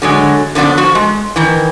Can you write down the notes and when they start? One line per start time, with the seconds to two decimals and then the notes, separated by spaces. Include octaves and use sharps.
0.02 D3 F#3 G#3
0.55 D3 F3 F#3 B3 D4
0.78 F3 F#4
0.95 G#3
1.36 D#3 E3